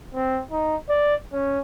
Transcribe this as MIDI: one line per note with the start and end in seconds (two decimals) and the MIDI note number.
0.15 0.41 60
0.51 0.76 63
0.89 1.15 74
1.32 1.59 61